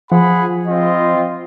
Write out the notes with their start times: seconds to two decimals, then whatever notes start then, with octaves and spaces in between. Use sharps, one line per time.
0.12 F3 G#4 F#5 B5
0.67 C4 F4 D#5